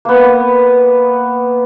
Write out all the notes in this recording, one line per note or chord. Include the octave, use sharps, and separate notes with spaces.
A#3 B3